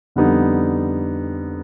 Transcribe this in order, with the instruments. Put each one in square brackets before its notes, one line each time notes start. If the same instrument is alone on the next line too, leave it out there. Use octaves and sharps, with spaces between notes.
[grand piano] F2 D3 G3 B3 D#4